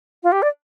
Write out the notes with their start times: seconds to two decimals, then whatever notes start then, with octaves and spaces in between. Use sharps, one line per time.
0.23 F4
0.32 G4
0.42 D5